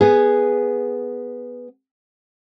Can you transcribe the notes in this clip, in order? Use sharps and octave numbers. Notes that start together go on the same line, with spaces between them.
B3 G#4